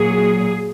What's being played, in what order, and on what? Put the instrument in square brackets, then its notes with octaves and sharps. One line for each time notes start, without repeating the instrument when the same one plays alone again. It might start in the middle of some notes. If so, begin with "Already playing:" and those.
Already playing: [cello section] A#2 F#3 G#4